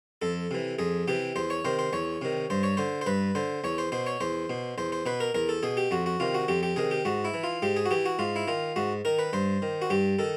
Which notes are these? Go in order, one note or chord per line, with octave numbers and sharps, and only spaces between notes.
F2 A4
C3 E3
F2 G#4
C3 E3 G4
E2 C5
C#5
C3 D#3 C5
C5
E2 C#5
C3 D#3
G2 C5
C#5
D3 C5
C5
G2 B4
D3 C5
E2 C#5
C5
B2 C5
C#5
E2 C5
B2
E2 C5
C5
B2 B4
A#4
E2 A#4
A4
B2 G#4
G4
F2 F#4
F#4
C3 D#3 F4
F#4
F2 G4
G4
C3 D#3 G#4
G4
G#2 F#4
E4
E3
F4
G#2 G4
G#4
F#4
E3 G4
F#4
G#2 F4
E4
D#3 F4
G#2 F#4
D#3 A#4
B4
G2 C5
D#3
F#4
G2 G4
D#3 A4